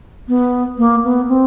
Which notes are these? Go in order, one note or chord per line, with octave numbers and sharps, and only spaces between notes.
B3
A#3
B3
C4